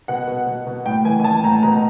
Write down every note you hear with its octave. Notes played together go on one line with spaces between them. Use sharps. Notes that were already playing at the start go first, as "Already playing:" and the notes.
B2 F#5
B2
B2
B2
A2 G5
E3 G#5
G#5
E3 A5
A2 A#5
B2 A#5